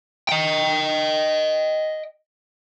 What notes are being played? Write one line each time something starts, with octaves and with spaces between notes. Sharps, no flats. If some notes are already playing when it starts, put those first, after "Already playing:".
D#5 G5